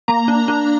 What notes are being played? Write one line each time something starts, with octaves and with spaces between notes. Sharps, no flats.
A#3 A#5
D4
D4